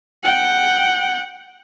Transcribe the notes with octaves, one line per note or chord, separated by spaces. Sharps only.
F#5 G5